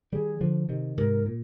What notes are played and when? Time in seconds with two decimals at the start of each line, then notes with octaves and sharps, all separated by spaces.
0.12 D#3 G3 G#4
0.41 D3 F3
0.69 C3 D#3
0.97 G#2 C3 A#4
1.26 A#2